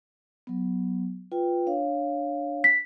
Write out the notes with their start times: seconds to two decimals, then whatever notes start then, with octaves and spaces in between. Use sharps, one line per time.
0.47 F#3 B3
1.32 F4 B4 G5
1.67 D4 C#5 F5
2.64 B6